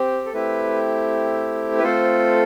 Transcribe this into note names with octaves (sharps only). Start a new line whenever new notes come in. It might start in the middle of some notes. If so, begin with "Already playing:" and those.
Already playing: C4 G4
A4
A3 C4 E4 G4 B4
B4
A3 C4 F4 A4 C5